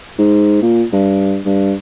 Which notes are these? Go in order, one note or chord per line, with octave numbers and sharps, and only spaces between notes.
G#2
A#2
G2
G2